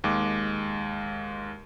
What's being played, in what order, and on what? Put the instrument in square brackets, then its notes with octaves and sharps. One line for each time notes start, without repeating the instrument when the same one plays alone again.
[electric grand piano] D#2 G#3 D6